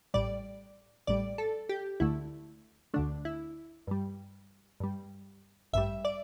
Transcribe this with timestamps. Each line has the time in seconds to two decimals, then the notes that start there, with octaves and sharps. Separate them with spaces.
0.14 A1 A2 G3 D5
1.07 A1 A2 G3 D5
1.38 A4
1.69 G4
2.00 D2 D3 A3 E4
2.94 D2 D3 A3 D4
3.25 E4
3.87 G2 G3
4.80 G2 G3
5.73 A1 G2 G3 E5
6.05 D5